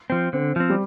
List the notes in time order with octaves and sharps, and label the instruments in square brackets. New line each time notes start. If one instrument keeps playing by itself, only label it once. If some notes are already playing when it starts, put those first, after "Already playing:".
[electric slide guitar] F3 C4
[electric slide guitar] D3 [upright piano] C4
[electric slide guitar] F3 C4
[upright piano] G3